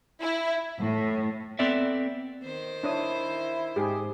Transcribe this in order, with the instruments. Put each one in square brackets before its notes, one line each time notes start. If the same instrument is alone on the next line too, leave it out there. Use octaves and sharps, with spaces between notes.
[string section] E4
A2
[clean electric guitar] B3 C4 A4 D5 E5
[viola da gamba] D#3 C5
[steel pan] D4 C#5 D#6 [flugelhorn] E4
[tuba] G#2 [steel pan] G4 G#4